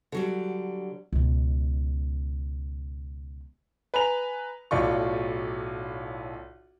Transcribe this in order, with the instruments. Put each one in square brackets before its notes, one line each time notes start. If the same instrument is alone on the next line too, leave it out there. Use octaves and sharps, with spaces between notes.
[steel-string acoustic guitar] D3 F#3 G3
[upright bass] C#2 B2
[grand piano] B4 G#5 A#5 F7
B1 A2 F4 D5 C#6